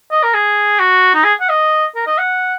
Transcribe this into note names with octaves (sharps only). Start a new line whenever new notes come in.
D#5
A#4
G#4
F#4
D#4
G#4
F#5
D#5
A#4
D#5
F#5